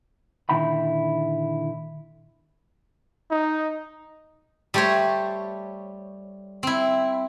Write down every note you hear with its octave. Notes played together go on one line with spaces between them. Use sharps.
A#2 D3 D#3 E4 G5 B5
D#4
G3 A3 G4 C5 C#5
C4 E4